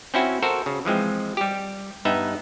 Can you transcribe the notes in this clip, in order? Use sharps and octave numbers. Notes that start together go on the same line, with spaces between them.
C4 C#4 E4 F#4
F#4 A4 A#4 C5
C#3
E3 F3 G#3 C4
G3 G4
G2 B3 D#4 E5